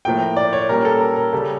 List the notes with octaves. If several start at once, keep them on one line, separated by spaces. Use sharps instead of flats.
A2 F3 A#3 G5
D5
C#5
A#2 G3 C#4 A#4
A4
A#4
A#4
C#3 G3 C#4 A4